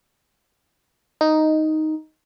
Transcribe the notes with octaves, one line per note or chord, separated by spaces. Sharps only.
D#4